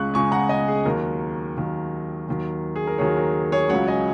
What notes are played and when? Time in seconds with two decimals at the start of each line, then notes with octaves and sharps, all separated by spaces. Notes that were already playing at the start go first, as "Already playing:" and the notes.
Already playing: C#2 C#3 G#3 C#6 F#6
0.14 C#2 C#3 G#3 G#5 C#6
0.32 F#5 A#5
0.49 D#5 G#5
0.68 G#4
0.85 D#2 D#3 F#3 A#4
1.57 D#2 D#3 F#3
2.28 D#2 D#3 F#3
2.76 G#4
2.87 A#4
2.98 D#2 D#3 F#3 G#4 C#5
3.17 A#4
3.52 G#4 C#5
3.69 C#2 C#3 F#3 C#5 F#5
3.88 D#5 G#5